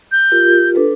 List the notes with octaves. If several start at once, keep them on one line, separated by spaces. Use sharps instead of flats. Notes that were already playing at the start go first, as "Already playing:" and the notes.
G6
F4 G4 A#4
D4 A4 B4